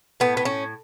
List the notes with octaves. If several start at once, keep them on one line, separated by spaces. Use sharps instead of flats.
A2 B3
B3
A2 C#4